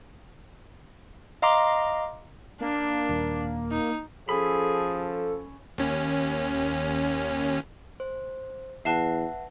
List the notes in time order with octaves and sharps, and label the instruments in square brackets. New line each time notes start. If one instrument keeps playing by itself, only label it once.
[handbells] D#5 F5 A#5 C6 D6
[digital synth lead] A#3 [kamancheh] D4
[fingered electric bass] D#1
[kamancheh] D#4
[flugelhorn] F3 [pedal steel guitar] C#4 B5 [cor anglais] G#4 [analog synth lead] A4
[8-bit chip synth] D#2 C#4
[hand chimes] C5
[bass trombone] E2 [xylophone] B4 A5 C7 [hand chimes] E5 F#5